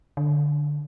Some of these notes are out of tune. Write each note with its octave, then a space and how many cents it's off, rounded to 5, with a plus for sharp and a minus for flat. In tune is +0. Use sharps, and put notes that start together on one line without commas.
D3 +5